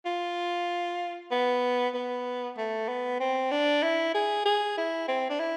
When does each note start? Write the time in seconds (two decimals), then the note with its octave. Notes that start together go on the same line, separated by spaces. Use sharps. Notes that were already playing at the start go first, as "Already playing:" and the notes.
0.06 F4
1.32 B3
1.94 B3
2.58 A3
2.89 B3
3.20 C4
3.51 D4
3.83 E4
4.15 G#4
4.45 G#4
4.78 E4
5.08 C4
5.30 D4
5.40 E4